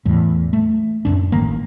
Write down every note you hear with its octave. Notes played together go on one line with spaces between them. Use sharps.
E2 A2
A3
D1 G1 F#2 D4
A1 D#3 A#3